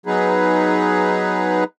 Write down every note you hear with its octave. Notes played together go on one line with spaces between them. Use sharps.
F#3 B3 D#4 G#4 B4